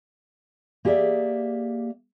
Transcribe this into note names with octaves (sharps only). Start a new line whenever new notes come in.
A#3 G4 G#4 C#5 D5 E5